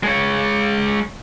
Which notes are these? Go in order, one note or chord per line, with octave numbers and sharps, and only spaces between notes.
G#3 C#5